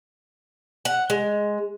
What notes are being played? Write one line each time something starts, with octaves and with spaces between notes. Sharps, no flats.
F#5
G#3